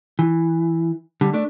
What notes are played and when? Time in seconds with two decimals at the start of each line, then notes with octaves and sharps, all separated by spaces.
0.19 E3
1.21 D3 G3
1.33 A3 D4